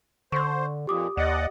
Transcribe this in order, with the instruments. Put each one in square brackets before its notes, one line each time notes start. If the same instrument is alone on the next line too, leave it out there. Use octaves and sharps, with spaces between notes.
[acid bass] D3 [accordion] C5 [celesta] C6 C#6
[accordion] F2 A#2 [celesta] G4 D6 D#6
[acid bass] D#2 [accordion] D5 D#5 F#5